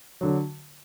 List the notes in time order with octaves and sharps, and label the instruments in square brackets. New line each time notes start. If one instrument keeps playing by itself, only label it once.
[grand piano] D3 F#3